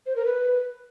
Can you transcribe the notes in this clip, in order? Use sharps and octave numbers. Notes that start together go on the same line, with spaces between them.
C5
A#4
B4